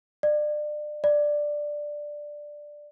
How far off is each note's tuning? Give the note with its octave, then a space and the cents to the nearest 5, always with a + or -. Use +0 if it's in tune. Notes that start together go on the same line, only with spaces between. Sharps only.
D5 +30
D5 +5